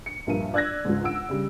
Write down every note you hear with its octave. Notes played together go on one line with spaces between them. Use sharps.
C#7
A#1 G2 A#4 D#7
D5 E6 F#6 G#6 A#6
C#2 G#2
F#5 E6 D7
C#3 G3